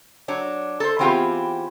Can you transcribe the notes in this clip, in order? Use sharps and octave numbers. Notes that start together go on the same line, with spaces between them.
F#3 D4 C#5
A4 C5
E3 B3 C4 F4 G4 G#4